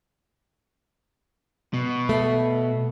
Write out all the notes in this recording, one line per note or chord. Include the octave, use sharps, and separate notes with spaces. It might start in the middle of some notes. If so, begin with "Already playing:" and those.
B2
A3